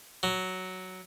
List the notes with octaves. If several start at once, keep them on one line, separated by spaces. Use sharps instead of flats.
F#3